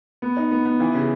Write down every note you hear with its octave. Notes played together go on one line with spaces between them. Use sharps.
B3
D#4
B3
B3
E3
C#3